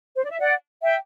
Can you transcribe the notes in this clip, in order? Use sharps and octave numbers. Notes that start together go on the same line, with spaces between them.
C5
D5
E5
D5 F#5
E5 G5